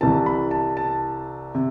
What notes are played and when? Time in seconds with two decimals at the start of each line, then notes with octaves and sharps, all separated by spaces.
0.01 C2 C3 E3 A5
0.26 B5
0.51 A5
0.77 A5
1.55 C3